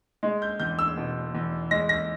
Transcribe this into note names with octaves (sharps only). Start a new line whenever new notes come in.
G#3
G6
E2 G6
E6
B2
E2
G#3 A#6
A#6